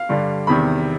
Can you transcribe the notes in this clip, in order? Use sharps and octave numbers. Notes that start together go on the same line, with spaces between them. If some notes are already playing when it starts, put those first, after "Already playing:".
Already playing: F5
G2 D3 G3
E2 C3 D#3 B5